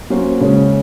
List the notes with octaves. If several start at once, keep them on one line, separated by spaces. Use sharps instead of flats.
F#3 A#3 C#4 F#4 C5
C#3 G#3 C#4 G#4